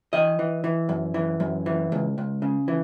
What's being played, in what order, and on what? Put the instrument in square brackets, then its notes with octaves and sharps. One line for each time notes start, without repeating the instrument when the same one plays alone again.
[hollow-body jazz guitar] E3 D#5
E3
E3
F#2
E3
F#2
E3
C#2
C#2
C#3
E3